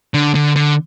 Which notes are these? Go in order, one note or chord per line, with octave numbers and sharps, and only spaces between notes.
D3
D3
D3